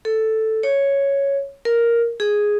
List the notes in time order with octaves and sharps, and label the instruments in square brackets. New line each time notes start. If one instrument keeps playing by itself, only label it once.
[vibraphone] A4
C#5
A#4
G#4